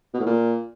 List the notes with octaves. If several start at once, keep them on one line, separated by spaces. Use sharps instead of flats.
B2
A2
A#2